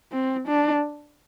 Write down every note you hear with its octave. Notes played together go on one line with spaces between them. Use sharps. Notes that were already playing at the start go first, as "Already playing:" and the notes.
C4
D4